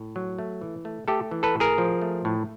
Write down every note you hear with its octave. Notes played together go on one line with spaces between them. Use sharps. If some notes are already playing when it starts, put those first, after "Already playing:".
Already playing: A2
F#3
A3
E3
A3
A3 G4 A4
E3
A4 B4
A2
G#4 A#4
F3
A3
A2